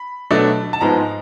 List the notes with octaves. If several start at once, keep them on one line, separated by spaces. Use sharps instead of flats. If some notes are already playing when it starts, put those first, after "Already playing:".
Already playing: B5
B2 F#3 A3 D4
A5
G#2 F3 G#3 B3 A#5